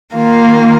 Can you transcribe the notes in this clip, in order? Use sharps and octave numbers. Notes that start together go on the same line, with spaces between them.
D#3 A#3 F4